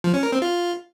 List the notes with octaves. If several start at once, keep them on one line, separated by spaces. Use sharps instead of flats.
F3
C#4
A#4
C4
F4